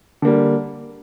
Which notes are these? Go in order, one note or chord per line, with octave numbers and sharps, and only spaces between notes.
D3 G3 A#3